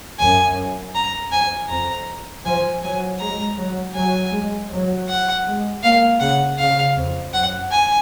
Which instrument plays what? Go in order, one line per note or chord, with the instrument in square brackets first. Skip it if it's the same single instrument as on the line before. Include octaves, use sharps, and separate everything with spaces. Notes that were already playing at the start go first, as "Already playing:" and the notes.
[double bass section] F#2 [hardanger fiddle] G#5
[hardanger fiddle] A#5
[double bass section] F2 [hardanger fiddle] G#5
[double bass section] F2 [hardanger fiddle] A#5
[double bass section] F3 [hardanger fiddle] G#5
[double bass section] F#3 [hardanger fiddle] G#5
[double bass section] G#3 [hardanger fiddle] A#5
[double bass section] F#3
[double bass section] F#3 [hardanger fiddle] G#5
[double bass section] G#3
F#3
[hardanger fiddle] F#5
[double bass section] G#3
[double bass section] A#3 [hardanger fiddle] F5
[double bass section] C#3 [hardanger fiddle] F#5
[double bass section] C#3 [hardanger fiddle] F5
[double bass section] F2
[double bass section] F#2 [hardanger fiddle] F#5
[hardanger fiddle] G#5